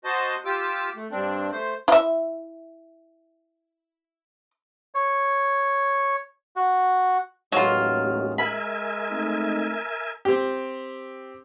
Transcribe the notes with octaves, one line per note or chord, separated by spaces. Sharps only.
F#4 C5 D#5 A5
F4 G4 D6 E6
A3
G2 C4 D4
A3 C5
E4 E5
C#5
F#4
A1 D#2 F#3 G#3 F4
A#4 E5 G#5 B5
A3 C4 D#4
C4 G4